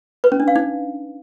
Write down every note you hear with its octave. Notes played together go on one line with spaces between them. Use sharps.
B4
C#4
D4
F5
D#4